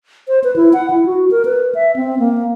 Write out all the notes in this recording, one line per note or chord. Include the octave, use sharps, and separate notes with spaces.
C5
B4
E4
F#5
E4
F#4
A#4
B4
E5
C4
A#3